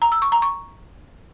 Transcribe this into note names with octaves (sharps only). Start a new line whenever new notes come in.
A#5
E6
C#6
A#5
C#6